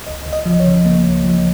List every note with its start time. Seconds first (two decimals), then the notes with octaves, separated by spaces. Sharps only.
0.07 C#2 D#5
0.26 C#2
0.33 D#5
0.45 F3
0.53 D#5
0.60 C#5
0.66 C#3
0.85 C#2 A#3
1.04 C#2
1.24 F3